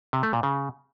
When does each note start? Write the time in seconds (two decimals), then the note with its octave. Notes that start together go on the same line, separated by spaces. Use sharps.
0.13 C3
0.23 A3
0.33 A#2
0.43 C#3